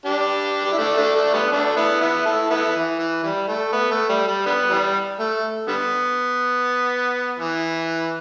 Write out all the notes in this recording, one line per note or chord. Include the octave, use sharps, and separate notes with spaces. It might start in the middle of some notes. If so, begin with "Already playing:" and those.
D4 G4
G4
E4
A3 D4
A3 D4
A3 D4
D3 G3 B3
A3 D4
B3 E4
B3 E4
E4 A4
B3 E4
E3
E3
E3 G3
A3
B3
A3
G3
G3
D3 G3 B3
E3 G3
A3
D3 G3 B3
E3